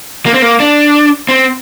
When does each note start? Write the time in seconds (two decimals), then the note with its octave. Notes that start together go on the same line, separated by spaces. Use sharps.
0.26 A#3
0.34 C4
0.42 A#3
0.60 D4
1.29 C4